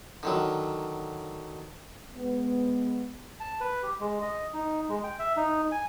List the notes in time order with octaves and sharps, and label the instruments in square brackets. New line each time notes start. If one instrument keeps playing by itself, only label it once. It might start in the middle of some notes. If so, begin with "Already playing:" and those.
[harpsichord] D3 D#3 F#3
[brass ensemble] G#3 B3
[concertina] A5
B4
G4
G#3
D#5
D#4
G#3
G5
E5
D#4
G#5